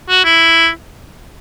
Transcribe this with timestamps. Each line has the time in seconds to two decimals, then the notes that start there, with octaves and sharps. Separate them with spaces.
0.10 F#4
0.25 E4